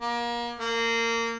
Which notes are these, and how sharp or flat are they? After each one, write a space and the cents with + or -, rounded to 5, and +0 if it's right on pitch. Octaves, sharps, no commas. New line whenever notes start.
A#3 +30
A#3 -20